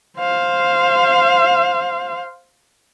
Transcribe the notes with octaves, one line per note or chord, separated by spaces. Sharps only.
C5 F5